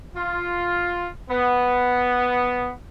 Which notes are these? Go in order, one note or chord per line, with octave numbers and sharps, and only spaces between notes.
F4
B3